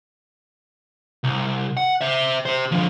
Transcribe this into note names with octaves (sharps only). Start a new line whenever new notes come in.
C2
F#5
C5 E5
G4 C5
D3 F3